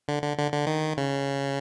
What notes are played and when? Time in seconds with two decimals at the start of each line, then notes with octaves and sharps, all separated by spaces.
0.08 D3
0.23 D3
0.38 D3
0.52 D3
0.67 D#3
0.97 C#3